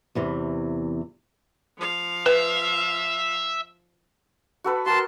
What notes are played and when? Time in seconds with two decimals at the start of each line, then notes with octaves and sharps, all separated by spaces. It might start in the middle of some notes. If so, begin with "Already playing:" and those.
0.15 E2 C3 E3
1.77 F3 F5
2.26 B4 E5
4.64 F#4 A4 B4
4.86 F#4 A#4 A5 C6